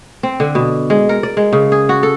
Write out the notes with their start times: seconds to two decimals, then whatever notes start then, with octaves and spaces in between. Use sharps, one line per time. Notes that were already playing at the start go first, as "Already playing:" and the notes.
0.23 C4
0.40 D3
0.55 B2
0.90 G#3
1.09 A#4
1.23 D5
1.37 G#3
1.53 C#3
1.72 G#4
1.89 F#4
2.03 A4